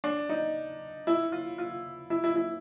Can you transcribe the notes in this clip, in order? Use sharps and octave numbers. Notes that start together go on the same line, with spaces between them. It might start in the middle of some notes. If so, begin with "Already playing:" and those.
D4
D#4
E4
F4
F4
E4
E4
E4